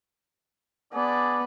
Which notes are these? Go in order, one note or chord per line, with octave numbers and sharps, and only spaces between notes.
B3 D4 G#4 D5